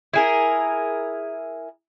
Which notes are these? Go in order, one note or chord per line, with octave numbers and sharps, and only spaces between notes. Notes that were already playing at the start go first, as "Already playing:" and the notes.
E4 G#4 A#4